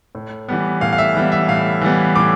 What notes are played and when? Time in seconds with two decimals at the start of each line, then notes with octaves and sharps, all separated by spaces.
0.15 A2
0.49 E3 G3 B3
0.81 A2 F5
0.93 F5
0.98 E5
1.15 E3 G3 B3
1.32 E5
1.48 A2 F5
1.81 E3 G3 B3
2.16 A2 D6